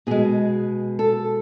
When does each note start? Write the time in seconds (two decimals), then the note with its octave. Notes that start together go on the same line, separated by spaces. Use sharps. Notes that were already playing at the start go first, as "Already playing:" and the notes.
0.07 B2 G#3 G#4
0.99 A4